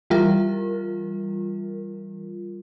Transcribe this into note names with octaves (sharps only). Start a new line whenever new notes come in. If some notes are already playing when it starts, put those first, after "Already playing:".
E3 G3 F4 A#4